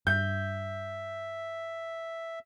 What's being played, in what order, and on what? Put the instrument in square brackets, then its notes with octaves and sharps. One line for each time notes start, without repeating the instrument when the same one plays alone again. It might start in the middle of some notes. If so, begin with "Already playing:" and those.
[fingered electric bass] G2 [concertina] E5 [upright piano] G6